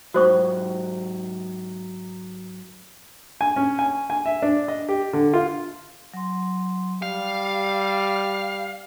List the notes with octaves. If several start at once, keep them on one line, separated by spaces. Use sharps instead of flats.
G#2 F#3 F#4 C5 C#6
G#5
C#4
G#5
G#5
E5
D4
D#5
G4
D3
F4
F#3 C6
G3 G4 F5